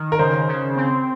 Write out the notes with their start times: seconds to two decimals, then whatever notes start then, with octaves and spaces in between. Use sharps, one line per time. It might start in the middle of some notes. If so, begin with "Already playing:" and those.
Already playing: D#3
0.12 A#4
0.19 C#3 C5
0.48 C#3
0.77 C4